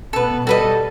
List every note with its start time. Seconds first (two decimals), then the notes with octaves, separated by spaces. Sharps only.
0.13 B2 B3 A4 B4
0.47 G3 F#4 A4 B4 D#5